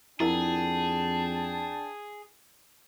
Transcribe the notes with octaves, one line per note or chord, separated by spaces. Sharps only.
F2 D4 E4 G#4 A#4 F#5 G5 A5